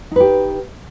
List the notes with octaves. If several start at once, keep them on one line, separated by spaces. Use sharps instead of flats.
D#4 G4 B4